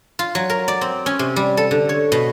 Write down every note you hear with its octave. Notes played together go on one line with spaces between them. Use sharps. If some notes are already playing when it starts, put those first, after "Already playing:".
F4
F#3
A#4
D5
C4
C#4
C3
G3
A4
D3
C#5
B2